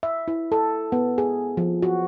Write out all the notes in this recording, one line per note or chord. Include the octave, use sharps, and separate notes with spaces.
E5
E4
A4
B3
G#4
F3
F#4